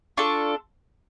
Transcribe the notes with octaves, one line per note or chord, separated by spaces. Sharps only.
D4 F4 A4 C#6